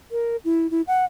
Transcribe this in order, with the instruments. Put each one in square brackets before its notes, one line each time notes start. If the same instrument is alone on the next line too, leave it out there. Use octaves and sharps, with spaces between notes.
[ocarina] A#4
E4
E4
F#5